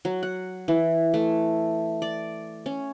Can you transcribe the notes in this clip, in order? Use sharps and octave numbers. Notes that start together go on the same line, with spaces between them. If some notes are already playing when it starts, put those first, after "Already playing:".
F#3
F#5
E3
A3
D5
C#4